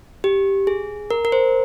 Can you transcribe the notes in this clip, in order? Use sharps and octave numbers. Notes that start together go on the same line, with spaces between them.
G4
G#4
A#4
A#4
C5